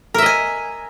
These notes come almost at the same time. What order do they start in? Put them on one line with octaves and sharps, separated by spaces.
A#4 E5 D#5 G#5